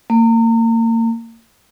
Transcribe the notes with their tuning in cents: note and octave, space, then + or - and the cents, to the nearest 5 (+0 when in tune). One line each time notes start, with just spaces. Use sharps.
A#3 -35